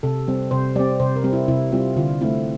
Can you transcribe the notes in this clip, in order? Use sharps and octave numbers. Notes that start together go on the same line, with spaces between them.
C3 A4
G3 C4
C3 C5
G3 C4 D5
C3 C5
A#4
G3 C4
E4
C3 E4
G3 C4 F4
D3 F4
A3 C4 E4